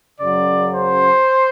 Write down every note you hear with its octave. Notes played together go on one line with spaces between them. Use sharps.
F#2 C#3 F#3 D5
C5